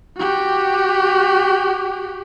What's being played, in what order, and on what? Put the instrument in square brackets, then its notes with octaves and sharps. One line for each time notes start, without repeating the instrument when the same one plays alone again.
[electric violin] F#4 G4